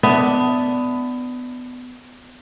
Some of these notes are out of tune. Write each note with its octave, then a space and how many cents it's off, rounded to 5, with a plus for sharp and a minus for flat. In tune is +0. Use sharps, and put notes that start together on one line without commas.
B3 +20 D4 +0 E5 +0